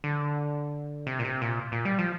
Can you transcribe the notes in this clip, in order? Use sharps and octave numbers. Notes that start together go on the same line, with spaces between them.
D3
C3
A#2
C3
A#2
A#2
G3
F3